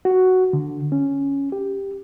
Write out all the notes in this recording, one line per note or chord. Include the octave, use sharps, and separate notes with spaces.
F#4
D3
C#4
G4